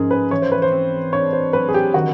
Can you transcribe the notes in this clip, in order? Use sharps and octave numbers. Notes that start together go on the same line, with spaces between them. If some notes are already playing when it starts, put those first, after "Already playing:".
Already playing: G#2 F3 C#4 G#4 A#4
B4
E3 C#5
C5
B4
C5
C4
D4 C#5
C5
F#3 B4
G#4
G4
D#3 F#4